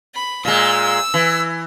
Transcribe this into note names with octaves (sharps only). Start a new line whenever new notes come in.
B5
A#2 G#3 E6
E3